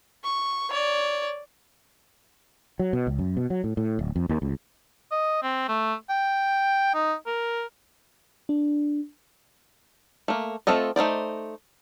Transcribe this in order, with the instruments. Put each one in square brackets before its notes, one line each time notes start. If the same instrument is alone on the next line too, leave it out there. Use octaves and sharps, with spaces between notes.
[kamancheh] C#6
C#5 D5
[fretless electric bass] F#3
B2
C#2
F#2
B2
F#3
A2
A2
D1
F2
D#2
C#2
[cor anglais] D#5
C4
A3
G5
D#4
A#4
[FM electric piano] D4
[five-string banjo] A3 A#3
A3 C4 F4 A4 D#5
A3 D#4 C5 D5